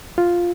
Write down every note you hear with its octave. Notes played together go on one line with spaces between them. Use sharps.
F4